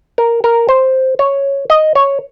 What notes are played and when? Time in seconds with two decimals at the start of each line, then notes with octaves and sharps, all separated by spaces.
0.18 A#4
0.44 A#4
0.69 C5
1.19 C#5
1.70 D#5
1.95 C#5